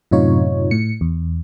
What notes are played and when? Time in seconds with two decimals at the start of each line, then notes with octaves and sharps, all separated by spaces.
0.11 F#2 A2 C3 D#4 F4 C#5
0.71 A2 C#7
1.01 E2